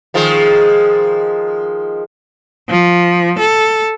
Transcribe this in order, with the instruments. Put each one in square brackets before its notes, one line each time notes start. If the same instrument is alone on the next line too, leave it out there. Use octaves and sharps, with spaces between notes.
[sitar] D#3 F3 G#3
[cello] F3
A4